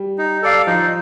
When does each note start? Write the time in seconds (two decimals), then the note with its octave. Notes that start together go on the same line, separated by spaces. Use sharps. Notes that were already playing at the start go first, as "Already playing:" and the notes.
Already playing: G3
0.18 D#4
0.42 A4 D5 F5
0.67 F3 D#4